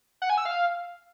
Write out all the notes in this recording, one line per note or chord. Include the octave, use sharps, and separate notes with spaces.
F#5
G#5
E6
F5